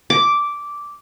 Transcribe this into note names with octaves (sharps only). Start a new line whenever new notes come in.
D6